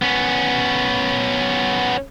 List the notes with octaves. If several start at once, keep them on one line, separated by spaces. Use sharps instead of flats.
B3 C#4